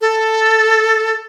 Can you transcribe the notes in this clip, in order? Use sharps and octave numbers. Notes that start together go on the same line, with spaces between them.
A4